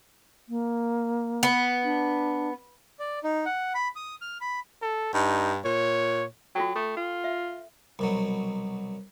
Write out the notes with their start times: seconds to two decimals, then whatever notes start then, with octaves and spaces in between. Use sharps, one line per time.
0.49 A#3
1.43 B3
1.84 D4
2.99 D5
3.24 D#4
3.46 F#5
3.75 B5
3.96 D#6
4.21 F6
4.41 B5
4.82 A4
5.14 G2 D#4
5.65 A#2 C#5
6.55 F#3 F4 A4 G5
6.76 A3 A4
6.97 F4
7.24 E5
7.99 C2 B2 F#3